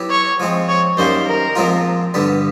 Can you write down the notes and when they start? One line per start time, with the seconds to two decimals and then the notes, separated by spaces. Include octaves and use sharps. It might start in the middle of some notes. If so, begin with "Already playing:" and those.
Already playing: F#3 B3 E4 G4 B4
0.10 C#5
0.40 F3 G#3 C4
0.68 C#5
0.97 F#2 D#3 G3 A#3 C5
1.27 A#4
1.55 A#2 F3 G#3 C4 F4
2.14 G2 D3 G3 B3